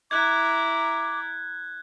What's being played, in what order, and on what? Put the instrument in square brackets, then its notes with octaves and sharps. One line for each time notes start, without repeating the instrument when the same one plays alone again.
[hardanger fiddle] E4 A#5 [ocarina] D6 [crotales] F#6 G#6